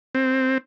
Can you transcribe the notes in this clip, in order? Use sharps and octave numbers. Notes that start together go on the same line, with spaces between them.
C4